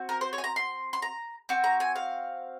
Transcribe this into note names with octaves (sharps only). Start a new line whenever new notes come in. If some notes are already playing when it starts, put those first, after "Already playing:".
Already playing: C4 F#4
A#4
C5
C#5
G#5
A#5
C6
C6
A#5
C4 F#4
A#5
G#5
F5